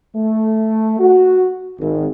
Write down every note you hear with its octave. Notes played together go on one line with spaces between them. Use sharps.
A3
F#4
G#1